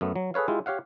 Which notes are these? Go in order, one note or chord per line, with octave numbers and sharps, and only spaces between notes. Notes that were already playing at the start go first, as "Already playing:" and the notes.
F#2 A3 B3
F#3
G#4 A4 B4 C#5 F5
G#3 E4 F4 G4
G4 C#5 F5 F#5